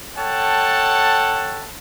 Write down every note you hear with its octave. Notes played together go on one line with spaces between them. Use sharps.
A4 C#5 F#5 G5 A5